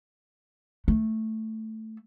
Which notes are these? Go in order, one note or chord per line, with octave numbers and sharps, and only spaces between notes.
A3